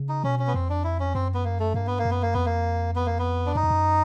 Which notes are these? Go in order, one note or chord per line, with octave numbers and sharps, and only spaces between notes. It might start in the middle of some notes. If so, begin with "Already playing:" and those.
Already playing: C#3
D#4
B2 C#4
C#4
B3
F2 C4
D4
E4
C#4
F#2 C4
B3
A#3
A3
G2 A#3
B3
A#3
F#2
B3
A#3
F2 B3
A#3
B3
A#3
B3
D4
F#2 D#4
F2
F#2